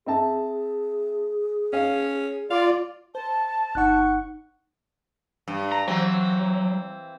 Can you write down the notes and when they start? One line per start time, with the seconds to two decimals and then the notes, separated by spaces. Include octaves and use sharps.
0.06 C4 G#4 E5 A5
1.73 C#4 F5
2.51 F4 D5 F5
3.15 C5 A5
3.75 G1 D#4 F#5 C#6 F#6
5.48 G2
5.72 A#5
5.88 E3 F#3 C4